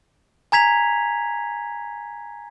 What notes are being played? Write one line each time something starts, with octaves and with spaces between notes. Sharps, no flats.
G#5 A#5 G#6 B6 F7